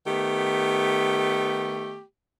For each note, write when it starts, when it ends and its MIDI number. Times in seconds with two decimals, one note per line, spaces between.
0.07 2.01 51
0.07 2.01 57
0.07 2.01 59
0.07 2.01 67